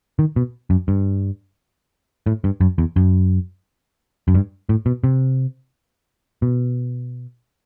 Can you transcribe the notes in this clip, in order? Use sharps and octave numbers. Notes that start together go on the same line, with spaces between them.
D#3
B2
F#2
G2
A2
G2
F#2
E2
F#2
F#2
G2
A2
B2
C3
B2